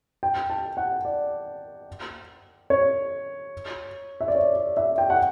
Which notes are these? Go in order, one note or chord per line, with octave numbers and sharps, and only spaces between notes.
G5
A5
F#5
D5
C#5
E5
D5
C#5
D5
E5
G5
F#5